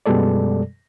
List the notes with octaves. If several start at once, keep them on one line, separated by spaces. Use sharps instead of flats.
F#2 B2 G3 G#3 A4 D5